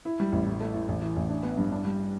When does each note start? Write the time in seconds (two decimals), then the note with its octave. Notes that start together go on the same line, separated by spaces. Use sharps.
0.05 E4
0.20 G3
0.32 A1
0.47 A2
0.61 A3
0.74 A2
0.88 A1
1.02 E3
1.16 A1
1.29 D4
1.43 B3
1.58 G2
1.72 D4
1.85 G3